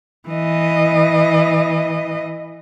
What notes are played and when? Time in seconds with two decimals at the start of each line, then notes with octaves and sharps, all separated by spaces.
0.29 E3 D#5